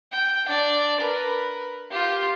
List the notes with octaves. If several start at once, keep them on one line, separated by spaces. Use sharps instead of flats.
G5
D4 D5
A#4 B4
F4 G4